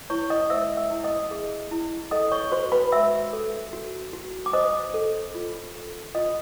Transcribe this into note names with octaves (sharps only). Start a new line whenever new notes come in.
E4 C#5 C#6
D#5 D#6
C5 E5 E6
E5 E6
E4
D#5 D#6
G#4
E4
A4 D#5 D#6
C#5 C#6
F#4 C5 C6
B4 B5
F#4 E5 E6
A4
F#4
F#4
D6
C5 D#5 D#6
A4
F4
A4
F4 D#5 D#6